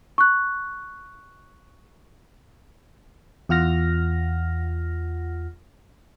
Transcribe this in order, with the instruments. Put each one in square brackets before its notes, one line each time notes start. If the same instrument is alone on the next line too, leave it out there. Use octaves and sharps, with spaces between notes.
[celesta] C#6 F#6
[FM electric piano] E2 F4 F#5 F6 A#6